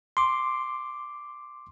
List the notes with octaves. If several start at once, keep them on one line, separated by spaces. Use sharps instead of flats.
C6 D6